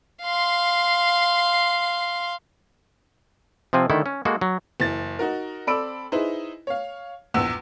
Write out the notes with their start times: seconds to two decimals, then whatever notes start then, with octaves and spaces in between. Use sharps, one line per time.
0.22 F5 C6
3.73 C3 F3 C4 G#5
3.90 D3 D#3 A3 E4 A4
4.06 C#4
4.25 G#3 A#3 F#4 A4
4.41 F#3
4.80 F#1 E3 A6
5.19 D#4 F#4 A#4
5.67 C4 A4 D5 B5 E6 D7
6.12 D#4 E4 G#4 B4 C5
6.67 C#5 F5
7.34 A#1 E2 F#5 E6